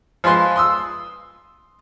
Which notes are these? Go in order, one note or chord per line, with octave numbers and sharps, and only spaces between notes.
F3 G#3 B4 C6 F#6
C6 D#6 E6